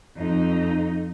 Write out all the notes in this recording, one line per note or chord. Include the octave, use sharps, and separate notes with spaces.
F2 D#4